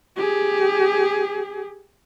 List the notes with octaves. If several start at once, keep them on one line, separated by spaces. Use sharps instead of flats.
G4 G#4